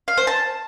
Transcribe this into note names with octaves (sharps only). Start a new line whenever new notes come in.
F5
C5
A5